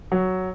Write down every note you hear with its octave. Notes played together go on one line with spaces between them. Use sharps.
F#3